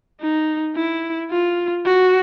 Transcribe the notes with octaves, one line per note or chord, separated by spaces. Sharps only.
D#4
E4
F4
F#4